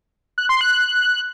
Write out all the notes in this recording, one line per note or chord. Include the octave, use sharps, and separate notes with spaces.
F#6
C6
F#6